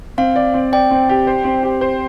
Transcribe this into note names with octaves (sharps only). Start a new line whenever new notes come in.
C4 F5
D5
C4
D5 G5
C4
G4
C5
C4
G4
C5